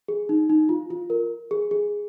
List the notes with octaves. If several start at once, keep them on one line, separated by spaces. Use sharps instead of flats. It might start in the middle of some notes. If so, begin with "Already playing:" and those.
G#4
D#4
D#4
F4
F4
A#4
G#4
G#4